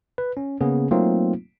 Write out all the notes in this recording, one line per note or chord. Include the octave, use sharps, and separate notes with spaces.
B4
C#4
C#3 A#3 B3 C#4 G#4
F#3 A3 A#3 C4 D#4 F4